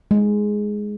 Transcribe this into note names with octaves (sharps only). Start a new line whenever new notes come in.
G#3